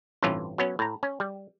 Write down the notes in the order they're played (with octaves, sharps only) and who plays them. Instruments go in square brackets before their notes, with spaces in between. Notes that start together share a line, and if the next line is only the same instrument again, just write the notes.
[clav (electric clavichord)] A1 G2 C3 E3 C#4 F4
F#3 B3 C#4
A2 A#5
C#4
G3